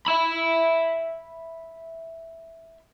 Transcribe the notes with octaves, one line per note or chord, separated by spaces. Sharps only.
E5 B5